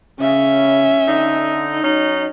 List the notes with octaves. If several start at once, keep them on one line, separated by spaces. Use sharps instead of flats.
C#3 C#4 E5
D3 D#4
F#3 C#4 D#4